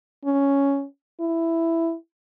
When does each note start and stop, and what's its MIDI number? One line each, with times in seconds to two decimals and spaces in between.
0.25 0.85 61
1.20 1.95 64